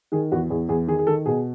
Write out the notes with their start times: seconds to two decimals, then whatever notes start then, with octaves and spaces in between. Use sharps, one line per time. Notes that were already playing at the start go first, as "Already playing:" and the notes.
0.12 D#3 G#4
0.32 E2 F#4
0.50 E2 G#4
0.69 E2 G#4
0.88 D#3 G#4
0.99 G#4
1.07 D#3 A4
1.26 B2 G#4